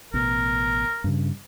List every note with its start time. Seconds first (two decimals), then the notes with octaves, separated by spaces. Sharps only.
0.14 A1 B2 A#4
1.04 G2 C#3